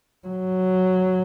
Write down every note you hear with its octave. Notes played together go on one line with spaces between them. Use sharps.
F#3